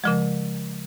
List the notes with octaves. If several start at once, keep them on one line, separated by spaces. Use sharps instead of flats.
C#3 F3 G#3